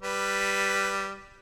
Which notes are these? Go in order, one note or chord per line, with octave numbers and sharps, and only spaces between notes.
G3 B4